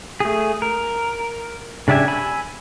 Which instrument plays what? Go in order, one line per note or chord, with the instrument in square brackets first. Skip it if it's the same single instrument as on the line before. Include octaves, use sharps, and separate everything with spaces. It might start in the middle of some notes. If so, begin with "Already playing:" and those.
[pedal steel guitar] A3 G#4
A#4
C#3 D4 G4 E5 G#5
G#5 B5 E6